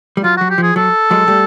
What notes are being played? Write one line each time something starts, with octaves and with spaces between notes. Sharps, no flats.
G3
F#3 F4
F#3 F#4
G4
F3 G#4
F#3 A4
F#3 G#3
G3 A3